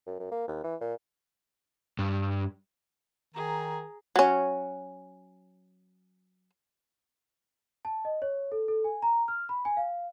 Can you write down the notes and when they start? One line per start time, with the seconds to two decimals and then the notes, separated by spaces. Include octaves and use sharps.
0.06 F#2
0.19 F#2
0.31 A#3
0.48 D#2
0.64 E3
0.81 A#2
1.99 G2
3.34 D#3 G#4 A#5
4.16 F#3 C#4
7.85 A5
8.05 D#5
8.22 C#5
8.52 A4
8.68 A4
8.84 G#5
9.02 A#5
9.28 F6
9.49 B5
9.65 G#5
9.77 F5